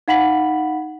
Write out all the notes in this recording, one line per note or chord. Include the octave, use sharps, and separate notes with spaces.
D#4 F5 F#5 B5 B6 F#7